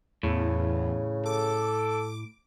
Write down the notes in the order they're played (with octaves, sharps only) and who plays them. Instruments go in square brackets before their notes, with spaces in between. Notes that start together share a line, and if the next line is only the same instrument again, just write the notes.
[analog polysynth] E2 [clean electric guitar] A2 [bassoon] C#3
[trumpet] A4 [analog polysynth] D6